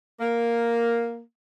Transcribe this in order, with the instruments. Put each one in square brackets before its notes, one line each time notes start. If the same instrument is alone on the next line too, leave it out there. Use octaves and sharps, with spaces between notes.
[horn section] A#3